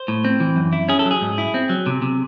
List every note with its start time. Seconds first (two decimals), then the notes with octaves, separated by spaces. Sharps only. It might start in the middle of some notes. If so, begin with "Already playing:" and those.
Already playing: C5
0.08 A2
0.25 C4
0.40 E3
0.56 F#2
0.73 E4
0.88 C#4 G#4
0.99 A4
1.05 F#3
1.11 G#4
1.21 G#2
1.38 E4
1.54 C4
1.69 F#3
1.86 C3
2.02 C3